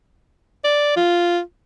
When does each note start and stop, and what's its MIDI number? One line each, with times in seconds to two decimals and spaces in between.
0.64 0.93 74
0.97 1.40 65